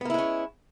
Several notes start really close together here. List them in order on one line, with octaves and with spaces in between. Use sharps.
B3 A#3 E4 G#3 C#4